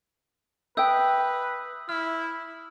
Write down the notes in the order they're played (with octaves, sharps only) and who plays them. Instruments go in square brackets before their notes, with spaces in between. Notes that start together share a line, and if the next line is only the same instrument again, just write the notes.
[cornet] B4 [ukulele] E5 G5 [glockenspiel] D#6 E6 G6
[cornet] E4 [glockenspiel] F6